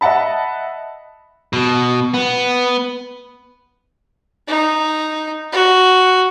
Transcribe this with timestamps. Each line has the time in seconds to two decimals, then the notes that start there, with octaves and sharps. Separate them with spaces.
0.01 D#5 E5 F#5 A5 B5
1.53 B2
2.14 B3
4.48 D#4
5.52 F#4